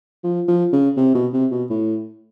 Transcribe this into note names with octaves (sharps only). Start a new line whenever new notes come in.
F3
F3
C#3
C3
B2
C3
B2
A2